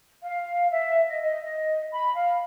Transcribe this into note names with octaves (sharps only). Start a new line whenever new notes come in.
F5
E5
D#5
D#5
D#5
B5
F5